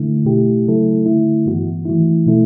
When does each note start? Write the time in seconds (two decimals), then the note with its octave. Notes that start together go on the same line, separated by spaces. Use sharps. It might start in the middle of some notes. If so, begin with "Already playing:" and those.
Already playing: D3 A3 E4
0.25 B2 A3 E4 G4
0.66 C#3 F#3 A3 E4 A4
1.06 D3 A3 E4
1.46 G2 E3 G3 B3 F#4
1.85 E3 A3 E4
2.26 B2 A3 E4 A4